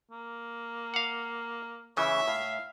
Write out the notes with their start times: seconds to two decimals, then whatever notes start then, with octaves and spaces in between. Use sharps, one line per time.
0.11 A#3
0.94 F5 F#5
1.97 C#3 E3 C#5 E5
2.28 A2 F5